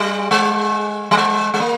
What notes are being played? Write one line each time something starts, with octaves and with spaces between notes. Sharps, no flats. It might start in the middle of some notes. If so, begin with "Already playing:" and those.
Already playing: G3
G#3
G3
G#3
G#3
A#3